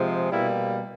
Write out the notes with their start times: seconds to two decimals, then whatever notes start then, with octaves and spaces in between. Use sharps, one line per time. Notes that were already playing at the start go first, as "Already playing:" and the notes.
Already playing: C3 F3 G#3
0.31 B2 G3 A#3 E4